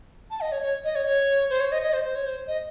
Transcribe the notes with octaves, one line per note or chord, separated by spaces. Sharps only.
A5
D#5
C#5
C#5
D#5
C#5
C#5
C5
C#5
D#5
D#5
C5
C5
C#5
C5
D#5